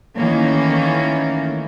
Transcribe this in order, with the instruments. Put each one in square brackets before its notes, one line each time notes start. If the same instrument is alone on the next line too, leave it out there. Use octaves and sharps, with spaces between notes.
[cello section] D#3 E3 A3 A#3 C#4